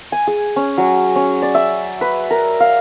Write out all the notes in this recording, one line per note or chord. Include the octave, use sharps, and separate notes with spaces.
G#5
G#4
C#4
F#3
C#4
D5
E5
B4
A#4
F5